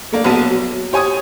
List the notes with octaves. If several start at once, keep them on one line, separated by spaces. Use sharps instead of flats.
A3 A#3 D4
A#1 F#3 B3 A5 D#7
F#3
G4 C#5 G#5 C#6 D#6